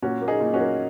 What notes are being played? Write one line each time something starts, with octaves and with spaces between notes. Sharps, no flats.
A#2 C#4 F#4
A#3
D#4 G#4
A#2
C#4 F#4
A#3